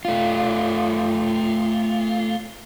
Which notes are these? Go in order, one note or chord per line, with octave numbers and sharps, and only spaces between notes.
A3 F4